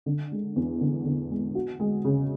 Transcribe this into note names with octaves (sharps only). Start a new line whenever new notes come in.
D3
G#3
E2
D3
D3
G#3
F#4
G#3
C#3